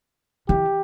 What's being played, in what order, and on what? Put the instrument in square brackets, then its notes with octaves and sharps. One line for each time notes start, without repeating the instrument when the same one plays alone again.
[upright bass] E3 [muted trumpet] G4